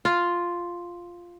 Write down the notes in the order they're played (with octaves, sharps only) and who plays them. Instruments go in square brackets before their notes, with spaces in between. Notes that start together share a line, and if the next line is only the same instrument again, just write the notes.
[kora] F4